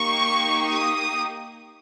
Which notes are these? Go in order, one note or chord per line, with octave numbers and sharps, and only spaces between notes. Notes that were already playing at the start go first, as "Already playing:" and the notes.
Already playing: A#3 D#4 G4 C#6
D#6